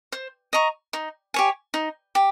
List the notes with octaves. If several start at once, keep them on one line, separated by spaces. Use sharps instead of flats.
C5
D#5 A#5 C#6
D#4
G4 C#5 G#5
D#4
G4